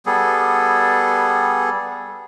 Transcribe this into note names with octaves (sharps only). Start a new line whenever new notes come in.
G3 B3 G#4 A4